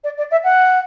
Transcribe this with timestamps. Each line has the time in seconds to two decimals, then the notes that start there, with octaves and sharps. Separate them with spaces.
0.04 D5
0.18 D5
0.31 E5
0.43 F#5